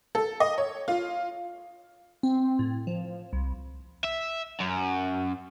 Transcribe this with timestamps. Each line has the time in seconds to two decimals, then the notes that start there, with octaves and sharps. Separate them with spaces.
0.15 A4
0.40 D#5
0.58 C#5
0.88 F4
2.23 C4
2.59 A2
2.87 F3
3.33 C2
4.04 E5
4.60 F#2